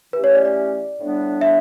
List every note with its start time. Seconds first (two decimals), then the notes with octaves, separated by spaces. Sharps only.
0.13 E3 A3 C#4 G4 B4
0.24 C#5
0.35 D5
0.45 D5
0.99 A2 G3 B3 D4
1.41 E5